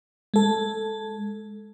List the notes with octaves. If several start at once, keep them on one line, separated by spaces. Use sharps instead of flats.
G#3 A4